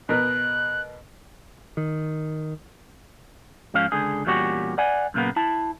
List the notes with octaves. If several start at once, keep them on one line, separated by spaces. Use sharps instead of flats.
B2 A#4 B4 F#6
D#3
G#2 F3 C#4 F5
C#2 D3 G#4
E2 A#2 G3 C#4 F#4 G4
D5 F#5 G#5
F#2 A#2 C#3 A#3 B3
E4 A5